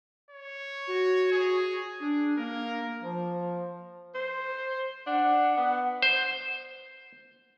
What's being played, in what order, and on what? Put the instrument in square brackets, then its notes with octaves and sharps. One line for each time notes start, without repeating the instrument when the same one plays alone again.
[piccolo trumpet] C#5
[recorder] F#4
[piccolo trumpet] G#4
[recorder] D4 [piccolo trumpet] G#4
[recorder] A#3 [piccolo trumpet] A#4
[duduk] F3
[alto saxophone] C5
[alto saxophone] D4 [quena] F#5
[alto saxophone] B3
[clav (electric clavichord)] C5